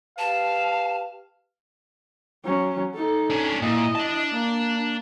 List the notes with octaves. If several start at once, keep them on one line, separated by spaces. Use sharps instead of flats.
G4 B4 F5 A5
F#3 C#4
D#4 A4
C#4 D4
A#2 E4 D#5
D4 A5
A#3